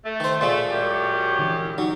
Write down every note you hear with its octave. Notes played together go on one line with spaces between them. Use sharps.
A3
D#3 C5
A#2 G#3 A3 C6 C#6
F#2 G4 D6 A6
D3 E3
F#3 D#4 F#4